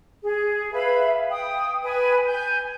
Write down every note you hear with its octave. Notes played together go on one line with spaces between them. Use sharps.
G#4
B4 E5 F5 B5
G5 D#6
B4 G#5
G#5 G6